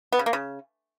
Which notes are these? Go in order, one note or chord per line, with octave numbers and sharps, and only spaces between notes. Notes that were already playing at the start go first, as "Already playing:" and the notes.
B3
C#3
A#3
C#3